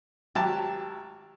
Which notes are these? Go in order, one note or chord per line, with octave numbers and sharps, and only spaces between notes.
G#1 F#3 G4 A5